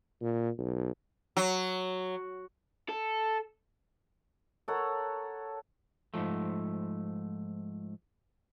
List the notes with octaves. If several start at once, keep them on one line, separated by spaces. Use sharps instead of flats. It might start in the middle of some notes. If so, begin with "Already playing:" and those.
A#2
B1
F#3
A4
A4 A#4 C#5 F#5
G#2 E3 F3 A3